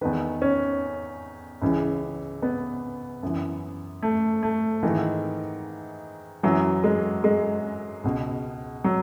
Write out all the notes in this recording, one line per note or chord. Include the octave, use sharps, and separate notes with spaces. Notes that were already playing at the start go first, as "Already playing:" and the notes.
E2 D#3 B4
C#4
C#2 C#3 E3
B3
F#2 E3
A3
A3
G#2 D#3 E3
F#2 E3 F#3
G#3
G#3
C#2 B2
F#3